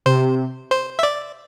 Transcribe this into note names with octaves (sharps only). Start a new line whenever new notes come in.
C3 C5
C5
E5
D5